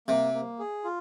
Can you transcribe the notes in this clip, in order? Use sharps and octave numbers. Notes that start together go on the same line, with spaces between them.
C3 A#3
A#3
G#4
F4